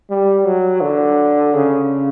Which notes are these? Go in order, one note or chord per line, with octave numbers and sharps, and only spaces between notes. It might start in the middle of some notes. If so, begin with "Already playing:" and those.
G3
F#3
D3
C#3